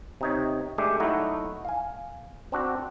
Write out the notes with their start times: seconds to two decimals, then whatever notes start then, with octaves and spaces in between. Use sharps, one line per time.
0.21 C3 D#4 C#5
0.78 G#3 A3 D4 G4
1.00 F#3 A3 D#4 E4 F#4
1.65 F5 G#5
2.52 C4 D4 F#4